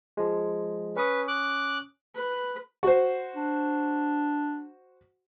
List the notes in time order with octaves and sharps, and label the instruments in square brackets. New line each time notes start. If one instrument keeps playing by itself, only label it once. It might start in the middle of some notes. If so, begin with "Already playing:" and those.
[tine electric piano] F3 G#3
[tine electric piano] C#4 C#6 D#6 [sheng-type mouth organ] B4
[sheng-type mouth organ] D6 F#6
[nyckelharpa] B4
[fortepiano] F#4 C5
[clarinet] D4